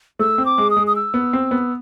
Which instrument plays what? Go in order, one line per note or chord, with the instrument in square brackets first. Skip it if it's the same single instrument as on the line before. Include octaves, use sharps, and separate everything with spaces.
[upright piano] A3 [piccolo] E6
[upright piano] C4
[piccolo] D6
[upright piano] G#3
[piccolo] D#6
[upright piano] G#3
[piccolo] D#6
E6
[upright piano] B3
C4
B3